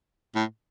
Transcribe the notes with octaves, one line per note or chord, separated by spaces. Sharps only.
A2